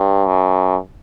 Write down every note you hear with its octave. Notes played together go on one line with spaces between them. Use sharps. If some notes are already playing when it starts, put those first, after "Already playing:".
Already playing: G2
F#2